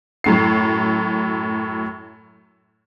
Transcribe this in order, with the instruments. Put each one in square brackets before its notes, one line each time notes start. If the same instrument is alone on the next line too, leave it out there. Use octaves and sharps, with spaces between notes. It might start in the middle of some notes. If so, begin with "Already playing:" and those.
[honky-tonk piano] F#2 A2 C7